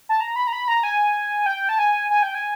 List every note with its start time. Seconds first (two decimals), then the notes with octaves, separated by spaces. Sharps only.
0.09 A5
0.20 A#5
0.36 B5
0.47 A#5
0.53 B5
0.68 A#5
0.83 G#5
1.46 G5
1.69 A5
1.79 G#5
2.10 G#5
2.23 G5
2.35 G#5